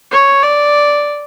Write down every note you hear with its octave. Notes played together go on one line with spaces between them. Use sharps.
C#5
D5